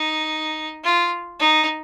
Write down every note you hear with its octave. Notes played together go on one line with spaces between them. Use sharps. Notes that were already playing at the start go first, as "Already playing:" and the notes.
Already playing: D#4
F4
D#4